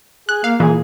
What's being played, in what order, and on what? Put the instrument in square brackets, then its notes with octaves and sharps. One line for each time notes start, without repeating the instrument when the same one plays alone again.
[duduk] G#4 [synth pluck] F#6
[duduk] A#3 [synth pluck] F5
[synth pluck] A#2 E3 [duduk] G#4